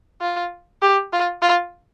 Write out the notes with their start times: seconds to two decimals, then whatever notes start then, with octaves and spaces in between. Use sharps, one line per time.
0.21 F4
0.82 G4
1.13 F4
1.42 F4